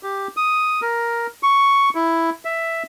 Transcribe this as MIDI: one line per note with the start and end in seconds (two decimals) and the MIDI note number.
0.03 0.28 67
0.37 0.81 87
0.82 1.27 70
1.43 1.89 85
1.95 2.30 64
2.45 2.83 76